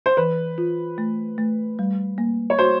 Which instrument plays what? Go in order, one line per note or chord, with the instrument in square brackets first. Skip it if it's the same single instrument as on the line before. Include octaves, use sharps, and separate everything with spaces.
[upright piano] C5
[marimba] E3 [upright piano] B4
[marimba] F4
A3
A3
G3
A#3
[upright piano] C#5
[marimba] F#4 [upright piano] C5